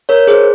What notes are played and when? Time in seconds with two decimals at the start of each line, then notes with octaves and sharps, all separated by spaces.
0.09 A#4 C#5
0.27 G#4 C5